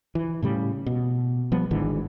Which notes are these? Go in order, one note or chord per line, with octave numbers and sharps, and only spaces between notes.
E3
A2 C#3 G3
B2
F3 G3 B3
G#1 G#2 D3 E3